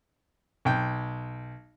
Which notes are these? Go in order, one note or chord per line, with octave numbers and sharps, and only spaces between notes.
B1 G5